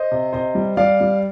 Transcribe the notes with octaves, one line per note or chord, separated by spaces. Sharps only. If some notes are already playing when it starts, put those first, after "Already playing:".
Already playing: C5 D#5
C3
C3 C5 D#5
G3
G3 D5 F5
G3